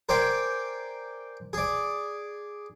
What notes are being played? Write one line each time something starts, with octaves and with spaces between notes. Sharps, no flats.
A#4 C5 D5 G5 G#5 C6
G#4 D5